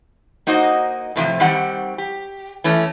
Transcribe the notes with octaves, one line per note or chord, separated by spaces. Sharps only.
A#3 D#4 F#4 C5 D#5
A2 C3 E3 F3
D#3 G3 C4 F#5
G4
E3 A3 C#4